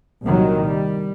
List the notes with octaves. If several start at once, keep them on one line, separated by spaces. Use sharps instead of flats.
C2 A#2 D#3 F#3
G3